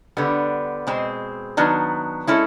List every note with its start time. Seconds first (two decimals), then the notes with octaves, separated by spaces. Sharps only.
0.17 D3 G3 B3
0.87 B2 G#3 C4
1.57 D#3 F#3 B3 D4
2.27 G#3 C#4 E4 A4